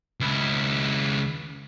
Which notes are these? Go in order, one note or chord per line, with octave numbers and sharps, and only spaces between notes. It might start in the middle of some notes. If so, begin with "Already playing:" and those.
C#2 E4